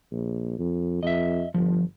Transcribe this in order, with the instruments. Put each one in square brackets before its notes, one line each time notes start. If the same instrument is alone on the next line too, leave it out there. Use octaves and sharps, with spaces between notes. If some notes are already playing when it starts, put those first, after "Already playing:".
[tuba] A#1
F2
[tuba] F2 [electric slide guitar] D#5 E5
[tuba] G1 [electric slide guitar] F3